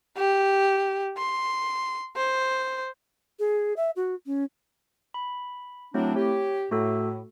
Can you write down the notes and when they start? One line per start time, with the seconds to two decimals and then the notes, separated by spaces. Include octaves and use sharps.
0.17 G4
1.17 C6
2.16 C5
3.39 G#4
3.77 E5
3.96 F#4
4.26 C#4
5.14 B5
5.94 F#3 A3 C4 D4 E4
6.16 G4 C#5
6.71 A2 A3 F#4 A4